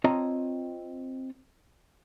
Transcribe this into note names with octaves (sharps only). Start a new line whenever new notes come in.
C4 F4 C#5 D#5 A5 A#5